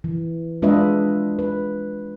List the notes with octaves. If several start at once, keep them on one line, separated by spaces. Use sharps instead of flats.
E3
G#3 D4 F4 B4 D#5 E5
B4